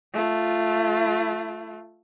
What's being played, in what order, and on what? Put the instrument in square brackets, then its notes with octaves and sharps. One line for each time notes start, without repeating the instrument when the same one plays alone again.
[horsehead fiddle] A3 F4